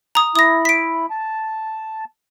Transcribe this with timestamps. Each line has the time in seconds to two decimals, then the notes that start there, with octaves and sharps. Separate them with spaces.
0.15 A#5 D#6
0.36 E4 D#6 A#6
0.65 B6 D7
1.10 A5